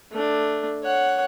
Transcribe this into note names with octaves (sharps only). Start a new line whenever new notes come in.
A3 D4
C#5 F#5